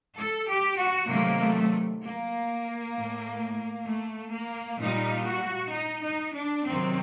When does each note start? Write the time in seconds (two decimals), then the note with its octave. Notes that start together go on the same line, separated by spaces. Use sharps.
0.17 A4
0.47 G4
0.78 F#4
1.08 C3 D#3 F#3 A3 A#3
1.40 A3
2.02 A#3
2.94 A2 A3
3.87 A3
4.33 A#3
4.79 A#2 G3 D#4
5.26 F#4
5.73 D#4
6.04 D#4
6.35 D4
6.65 C3 D#3 F#3 C4